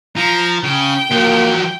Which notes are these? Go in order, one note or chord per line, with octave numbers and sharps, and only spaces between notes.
F3 A#5
C#3 G5
F3 F#3 A#3